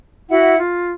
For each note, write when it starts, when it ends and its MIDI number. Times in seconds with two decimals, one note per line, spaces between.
0.30 0.57 64
0.30 0.57 66
0.30 0.57 76
0.30 0.57 78
0.58 0.91 65